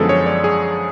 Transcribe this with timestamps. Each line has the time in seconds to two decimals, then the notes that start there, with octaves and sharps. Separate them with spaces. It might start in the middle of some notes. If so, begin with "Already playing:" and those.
Already playing: F#2 D3 F3 G#3 B3 G#4 A4
0.09 C#5
0.26 D5
0.44 G#4